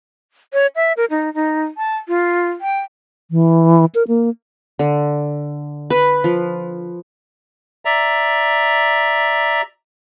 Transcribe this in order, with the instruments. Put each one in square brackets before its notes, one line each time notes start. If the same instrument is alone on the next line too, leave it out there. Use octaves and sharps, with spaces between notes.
[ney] C#5
E5
A#4
D#4
D#4
A5
F4
G5
[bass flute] E3
A#4
A#3
[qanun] D3
B4
F3
[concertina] D5 E5 A#5